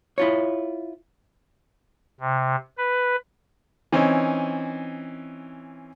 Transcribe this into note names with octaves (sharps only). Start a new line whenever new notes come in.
E4 F4 C#5
C3
B4
E3 C4 C#4 D#4